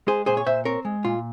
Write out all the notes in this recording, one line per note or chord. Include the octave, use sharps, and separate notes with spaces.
G#3 G#4 C5
A#2 G#4 C5
C#5
A#2 C5 E5
C4 A#4 C#5
G#3
A#2 F4